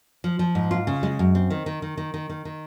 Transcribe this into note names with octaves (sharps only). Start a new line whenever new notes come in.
F3
F3
G#2
F4
C#3
G#3
F#2
C4
D#3
D#3
D#3
D#3
D#3
D#3
D#3